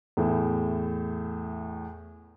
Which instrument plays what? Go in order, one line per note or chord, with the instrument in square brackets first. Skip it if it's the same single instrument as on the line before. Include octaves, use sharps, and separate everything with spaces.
[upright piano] E2 A2